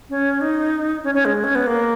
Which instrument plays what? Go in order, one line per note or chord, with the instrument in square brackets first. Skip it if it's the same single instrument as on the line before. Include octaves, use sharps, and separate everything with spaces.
[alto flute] C#4
D#4
C#4
C#4
G#3
C#4
B3
A#3